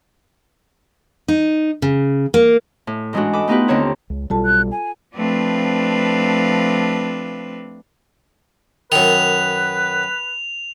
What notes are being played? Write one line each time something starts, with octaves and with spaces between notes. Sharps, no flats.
D#4
C#3
A#3
A2
G#2 E3 G#3 C#4 D4 F#4
A4 B5 D6 D#6
A3 B3 D#4 F4 G4 B4
D#2 D3 C4 C#5 A#5
C#2
B1 B2 G3 F4 A4 A5
F#6
G#5
F3 A3 C4 D4 B4 F5
F#2 D#3 B4 F7